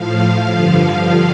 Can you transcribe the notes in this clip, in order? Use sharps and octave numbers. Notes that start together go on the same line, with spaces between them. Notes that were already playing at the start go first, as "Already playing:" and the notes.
Already playing: A2 F3 F5
G2 D3 F3